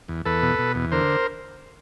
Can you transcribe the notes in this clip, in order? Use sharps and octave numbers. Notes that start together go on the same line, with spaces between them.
E2
E2 A4 B4
B2
B2
E2
D3 A#4 C5